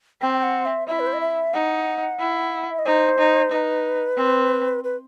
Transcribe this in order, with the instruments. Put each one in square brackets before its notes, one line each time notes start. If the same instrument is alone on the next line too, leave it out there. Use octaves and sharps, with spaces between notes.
[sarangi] C4 [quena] G5
[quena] G5
F#5
E5
[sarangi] E4 [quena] E5
[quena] B4
C5
D#5
E5
[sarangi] D#4 [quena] F#5
[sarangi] E4
[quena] E5
D#5
[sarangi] D#4 [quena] C5
[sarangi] D#4
[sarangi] D#4 [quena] B4
[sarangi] C4
[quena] B4